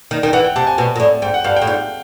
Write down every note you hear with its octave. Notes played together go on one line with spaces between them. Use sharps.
D#3
D#3 G5
E3 F#5
G5
C3 A5
G#5
B2 G#5
A#2
A2
G#2 G5
F#5
G2 F5
G5
A2
G#2